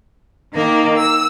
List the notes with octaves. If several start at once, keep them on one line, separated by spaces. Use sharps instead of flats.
D#3 A#3 A#4
E6